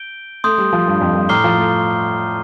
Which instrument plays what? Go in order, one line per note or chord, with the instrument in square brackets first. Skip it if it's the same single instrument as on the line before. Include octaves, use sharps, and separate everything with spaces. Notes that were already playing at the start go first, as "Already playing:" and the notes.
Already playing: [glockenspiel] G6 D7 G7
[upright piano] A3 [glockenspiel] C6 D#6 G6
[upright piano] G3
F3
G2
F2
G2
[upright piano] A2 [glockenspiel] A#5 D6 F6 C7 G7
[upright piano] F3
A3